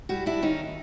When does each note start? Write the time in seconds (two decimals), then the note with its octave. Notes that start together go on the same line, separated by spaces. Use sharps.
0.09 G3 E4 F#4
0.26 D4 E4
0.42 D#3 C#4 D#4